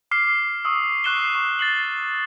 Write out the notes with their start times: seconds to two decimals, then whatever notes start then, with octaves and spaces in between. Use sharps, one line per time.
0.11 D6 F6 C7
0.65 C#6 D#6 E6
1.04 C#6 F#6 C7 E7 G7
1.35 C#6
1.59 A6 C7 F#7